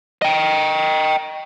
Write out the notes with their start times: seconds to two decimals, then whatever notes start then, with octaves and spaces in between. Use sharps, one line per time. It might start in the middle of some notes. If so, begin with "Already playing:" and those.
0.22 D#5 G5